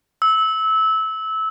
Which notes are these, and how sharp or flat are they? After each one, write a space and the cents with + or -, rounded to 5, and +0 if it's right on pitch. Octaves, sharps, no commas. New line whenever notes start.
E6 -20